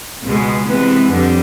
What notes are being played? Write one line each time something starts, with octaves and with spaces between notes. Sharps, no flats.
C#2 B2 G#3
C3 E3 G#3 B3
F2 D3 G3